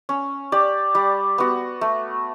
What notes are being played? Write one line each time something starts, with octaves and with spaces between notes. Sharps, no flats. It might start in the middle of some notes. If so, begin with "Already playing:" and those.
C#4
G4 D5
G3
B3 F#4
A3